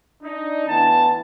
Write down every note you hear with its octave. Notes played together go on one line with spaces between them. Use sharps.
D4 D#4
D2 E3 B3 A5